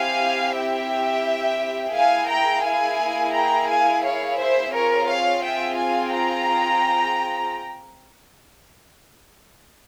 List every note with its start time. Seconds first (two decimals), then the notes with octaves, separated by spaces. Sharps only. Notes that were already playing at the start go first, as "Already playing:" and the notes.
Already playing: C4 E4 G4 F5 G#5
0.55 E5 G5
1.94 A#3 E4 G#4 F5 G#5
2.30 G5 A#5
2.64 F5 G#5
3.34 G5 A#5
3.68 F5 G#5
4.03 C#5 F5
4.38 C5 E5
4.72 C4 F4 G#4 A#4 C#5
5.07 C#5 F5
5.42 E5 G5
5.77 F5 G#5
6.12 G5 A#5